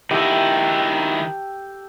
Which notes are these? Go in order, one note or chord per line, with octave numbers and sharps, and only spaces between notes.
D#3 D#4 E4 G4 A4